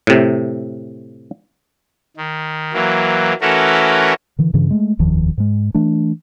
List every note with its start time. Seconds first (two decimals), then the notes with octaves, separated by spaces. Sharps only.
0.07 A2 C3
2.17 D#3
2.73 E3 F#3 A#3
3.41 E3 A3 C#4 F#4 A4 A#4
4.39 D3 E3
4.54 G2 C#3 E3
4.71 G#3 A3
4.99 F1 D#2 D#3 F3
5.38 G#2 G#3
5.74 E3 A3 D4